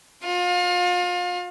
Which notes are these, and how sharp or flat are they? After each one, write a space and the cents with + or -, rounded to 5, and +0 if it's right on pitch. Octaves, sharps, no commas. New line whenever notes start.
F4 +35 F5 +30